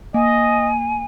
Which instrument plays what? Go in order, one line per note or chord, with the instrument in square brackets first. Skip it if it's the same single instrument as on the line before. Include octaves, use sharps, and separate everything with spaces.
[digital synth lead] A#3 [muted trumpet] D#5 [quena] G#5